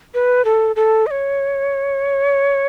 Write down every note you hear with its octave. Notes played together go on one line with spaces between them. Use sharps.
B4
A4
A4
D#5
C#5